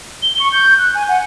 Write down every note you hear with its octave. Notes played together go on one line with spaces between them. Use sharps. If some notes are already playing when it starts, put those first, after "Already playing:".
G7
C#6
G6
F#6
G#5
F#5